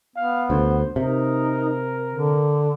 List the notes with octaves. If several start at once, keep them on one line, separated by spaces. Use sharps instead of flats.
B3 F5
D2 C5
C3 D#4 A#4
D3